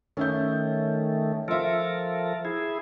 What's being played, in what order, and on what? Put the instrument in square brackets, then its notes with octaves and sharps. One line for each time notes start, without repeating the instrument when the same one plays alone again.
[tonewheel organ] D#3 A3 [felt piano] C#4 E5 G6
[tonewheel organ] F3 A4 A#4 [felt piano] F4 E5
[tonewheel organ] E4 G#4